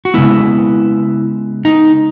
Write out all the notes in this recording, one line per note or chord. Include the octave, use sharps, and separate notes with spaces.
F#4
C#3 G#3 B3 E4
D#4